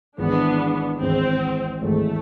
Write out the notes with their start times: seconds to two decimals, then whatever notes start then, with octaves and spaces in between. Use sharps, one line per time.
0.18 G#1 G#2 E3 G#3 B3 D4
1.00 G#1 G#2 E3 G#3 C4
1.82 G#1 G#2 E3 G#3 A3